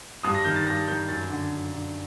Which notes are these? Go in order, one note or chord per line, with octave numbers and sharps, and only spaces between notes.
G2 D#6
A#6
D#3 G6
A6
G2 A#6
D#3 G6
F#2 A6
D3
F#2
D3